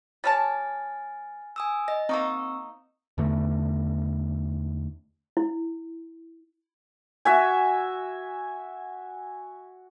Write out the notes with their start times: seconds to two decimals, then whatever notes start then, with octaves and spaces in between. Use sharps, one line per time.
0.24 G3 C#5 G#5 A5 F6 A6
1.56 G#5 D#6 E6
1.88 D#5 A#6
2.09 A#3 C4 D#4 C#6 E6
3.18 E2 D3 A3
5.37 E4
7.25 F#4 E5 G#5